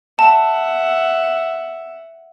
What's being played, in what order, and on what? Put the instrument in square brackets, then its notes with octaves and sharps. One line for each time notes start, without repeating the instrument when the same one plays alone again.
[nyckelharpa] E5 F#5 [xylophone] A5